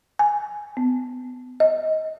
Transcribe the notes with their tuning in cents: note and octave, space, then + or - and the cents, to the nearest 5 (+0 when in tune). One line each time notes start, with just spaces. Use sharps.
G#5 +5
B3 +30
D#5 +20